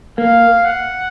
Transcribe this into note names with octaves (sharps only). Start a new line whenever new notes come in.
A#3 F5
F#5